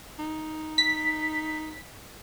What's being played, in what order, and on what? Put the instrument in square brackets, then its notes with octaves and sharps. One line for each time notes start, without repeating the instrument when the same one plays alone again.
[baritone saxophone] D#4
[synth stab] B6